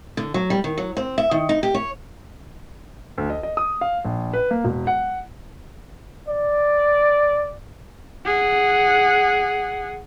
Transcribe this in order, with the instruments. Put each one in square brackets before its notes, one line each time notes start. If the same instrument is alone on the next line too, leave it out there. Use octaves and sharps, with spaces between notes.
[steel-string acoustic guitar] D3
F#3
G3
D#3
F#3
C4
E5
D#3
D#4
G4
C#5
[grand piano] D2
D#5
D#5
D#6
F5
A#1
B4
A#3
E1
F#5
[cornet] D5
[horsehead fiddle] G#4 F#5